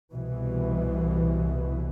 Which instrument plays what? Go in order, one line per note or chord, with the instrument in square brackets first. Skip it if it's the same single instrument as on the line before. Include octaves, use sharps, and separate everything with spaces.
[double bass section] C2 B2 E3